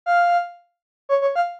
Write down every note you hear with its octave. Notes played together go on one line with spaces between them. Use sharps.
F5
C#5
C#5
F5